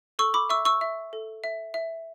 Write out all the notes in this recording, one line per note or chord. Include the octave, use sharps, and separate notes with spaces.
A4 C#6 E6
B5 D6
E5 C#6 E6
C#6 E6
E5
A4
E5
E5